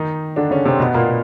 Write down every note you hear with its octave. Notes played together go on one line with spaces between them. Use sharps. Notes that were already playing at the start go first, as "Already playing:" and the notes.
Already playing: D#3 D#4
D3 D4
C#3 C#4
C3 C4
B2 B3
A#2 A#3